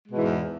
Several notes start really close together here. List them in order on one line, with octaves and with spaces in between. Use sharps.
G#3 B2 G#2 E3 E2